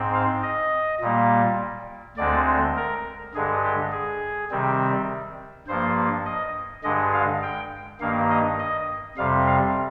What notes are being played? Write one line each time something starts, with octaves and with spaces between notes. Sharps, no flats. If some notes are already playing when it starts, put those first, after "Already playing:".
Already playing: G#2 C4
F5
D#5
A#2 G3 A#3
D2 D3 G#3 C4 D5
A#4
G2 D3 G#3 G#4
G4
G#4
C3 D#3 G3 C4
G2 F3 A#3 C5
D#5
G2 D3 G#3 D#5
F5
G5
G2 D#3 A#3 F5
D#5
D#5
F2 C3 G3 F5
F5